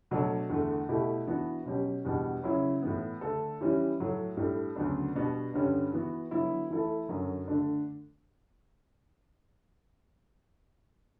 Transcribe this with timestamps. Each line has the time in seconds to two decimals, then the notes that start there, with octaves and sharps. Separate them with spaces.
0.11 B2 F#3 A3 D4
0.50 E2 D3 A3
0.89 B2 A3 E4 G4
1.27 E3 B3 D4 F#4
1.66 B2 F#3 C#4 G4
2.05 E2 B2 G3 B3 D4
2.43 C#3 F#3 C#4 E4
2.82 A2 E3 B3
3.21 D3 A3 D4 A4
3.61 E3 G3 C#4 E4 G4
4.00 A2 F#3 A3
4.37 A2 G3 D4 A4
4.76 D2 C#3 F#3 B3 D4
5.15 B2 G3 B3 D4 F#4
5.54 G2 D3 G3 C#4
5.93 E3 B3 F#4
6.31 D3 F#3 B3 E4
6.71 E3 A3 E4 A4
7.09 F#2 D3 F#3
7.48 D3 A3 D4